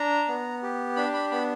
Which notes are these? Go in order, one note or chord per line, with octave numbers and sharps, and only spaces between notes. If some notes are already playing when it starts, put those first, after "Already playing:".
Already playing: D4 A#5
B3
G4
D4 B5
B5
B3 B5